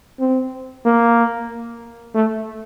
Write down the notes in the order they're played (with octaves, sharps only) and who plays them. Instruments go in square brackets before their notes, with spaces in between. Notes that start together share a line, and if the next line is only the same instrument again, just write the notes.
[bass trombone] C4
A#3
A3